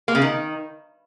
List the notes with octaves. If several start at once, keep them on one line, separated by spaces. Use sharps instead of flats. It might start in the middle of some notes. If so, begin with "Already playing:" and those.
A#3
C#3
D#3